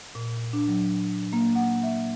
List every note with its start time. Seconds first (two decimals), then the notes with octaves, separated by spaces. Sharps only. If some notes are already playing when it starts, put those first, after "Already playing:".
0.15 A#2
0.53 D4
0.68 F#3
1.33 A#3
1.55 F#5
1.83 E5